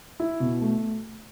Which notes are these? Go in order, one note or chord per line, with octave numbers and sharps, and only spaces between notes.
E4
B2
A3